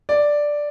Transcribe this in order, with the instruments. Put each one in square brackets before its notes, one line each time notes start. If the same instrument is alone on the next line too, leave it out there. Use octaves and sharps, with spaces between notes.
[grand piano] D5